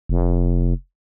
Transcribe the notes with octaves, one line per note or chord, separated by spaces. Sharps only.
F1